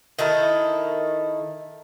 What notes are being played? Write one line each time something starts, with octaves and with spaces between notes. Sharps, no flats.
D#3 D#4 E4 A4